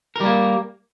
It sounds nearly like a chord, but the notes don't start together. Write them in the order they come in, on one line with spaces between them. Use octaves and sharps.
A#4 G3 A#3